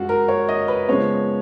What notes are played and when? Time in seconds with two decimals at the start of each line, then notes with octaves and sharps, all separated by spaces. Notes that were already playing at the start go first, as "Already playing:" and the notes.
Already playing: F#2 F3 G#3 F4 F#4
0.09 A#4
0.28 C#5
0.49 D#5
0.68 B4
0.88 C#3 F3 G#3 B3 C#5